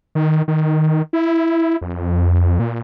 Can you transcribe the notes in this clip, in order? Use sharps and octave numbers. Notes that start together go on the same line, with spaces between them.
D#3
D#3
E4
F2
A#2